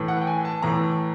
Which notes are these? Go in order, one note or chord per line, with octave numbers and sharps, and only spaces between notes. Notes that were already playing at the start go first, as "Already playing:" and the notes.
Already playing: A2 E3
F#5
G5
G#5
A5
A2 E3 A#5